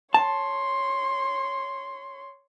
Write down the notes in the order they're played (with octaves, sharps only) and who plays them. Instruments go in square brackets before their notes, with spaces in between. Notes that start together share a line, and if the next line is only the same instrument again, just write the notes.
[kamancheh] C#5 C6 [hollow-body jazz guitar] A5